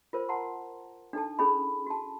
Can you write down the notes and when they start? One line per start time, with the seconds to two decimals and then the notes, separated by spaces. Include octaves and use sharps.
0.13 F4 A#4 C5
0.29 F#5 A5 A#5 C6
1.13 D4 D#4 A4 A5
1.39 C#4 E4 G#4 A4 G#5 B5
1.86 F#4 A5